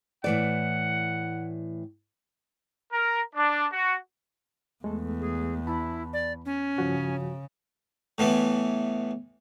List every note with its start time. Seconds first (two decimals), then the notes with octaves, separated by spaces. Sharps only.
0.24 A2 E3 D5 F#5
2.93 A#4
3.36 D4
3.72 F#4
4.84 E2 G#3 A3 A4
5.21 G#4
5.67 E4 A5 B5
6.13 D5
6.45 C#4
6.78 G2 C#3 F3 F#4
8.18 A2 E3 B3